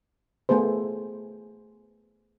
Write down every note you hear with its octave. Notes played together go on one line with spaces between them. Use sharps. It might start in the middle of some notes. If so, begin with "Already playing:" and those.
A3 B3 G#4 C5